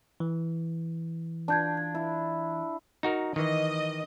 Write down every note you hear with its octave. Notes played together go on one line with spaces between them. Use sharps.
E3
D4 F4 A5 G6 G#6
G#6
E4
D#4 F#4 A#4
D#3 E3 D#5